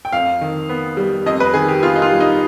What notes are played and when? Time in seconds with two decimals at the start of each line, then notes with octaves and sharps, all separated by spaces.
0.05 G5
0.12 F2 F5
0.41 D#3
0.69 B3
0.97 G3
1.26 F2 D#5
1.40 B4
1.54 D#3 G#4
1.68 G4
1.82 B3 F4
1.96 D#4
2.02 F4
2.11 G3
2.20 D#4